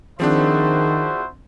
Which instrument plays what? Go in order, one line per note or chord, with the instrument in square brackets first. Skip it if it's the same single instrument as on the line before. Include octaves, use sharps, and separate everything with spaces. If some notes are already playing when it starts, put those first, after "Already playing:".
[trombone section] D#3 [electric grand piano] F3 C4 D4 [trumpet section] E4 F#4 C5 [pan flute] G#4